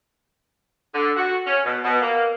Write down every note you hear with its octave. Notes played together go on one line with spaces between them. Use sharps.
D3
F#4
C#4
B2
B2
A#3